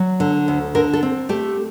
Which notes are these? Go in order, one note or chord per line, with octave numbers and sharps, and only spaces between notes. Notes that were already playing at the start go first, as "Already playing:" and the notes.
Already playing: F#3
D3
D2
D3 A#4
A4
C4
A3 G4